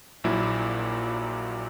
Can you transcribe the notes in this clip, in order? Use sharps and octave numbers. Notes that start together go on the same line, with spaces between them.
A#1 A#2 F#3 A#3 E4